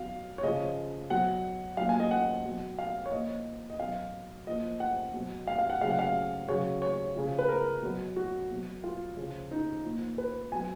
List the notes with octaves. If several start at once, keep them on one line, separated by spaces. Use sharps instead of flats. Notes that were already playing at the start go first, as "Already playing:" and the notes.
Already playing: B2 F#3 F5
C#5
C#3 F3 D#5
B2 F#3 F#5
A#2 F#3 F5
G#5
D#5
F#5
B2 F#3
F5
C#5
A#2 F3 D#5
D#5
B2 F#3 F5
A#2 F3 D#5
F#5
B2 F#3
F5
F5
F#5
C#3 F#3 F5
F#5
F5
C#3 F#3 C#5
C#5
C#3 F3
B4
A#4
B2 F#3
F#4
B2 F#3
F4
C#3 F3
D#4
A#2 F3
B4
B2 F#3 G#5